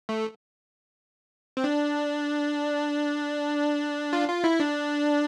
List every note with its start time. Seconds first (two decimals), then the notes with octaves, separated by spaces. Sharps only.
0.09 A3
1.57 C4
1.64 D4
4.13 F4
4.28 F4
4.44 E4
4.60 D4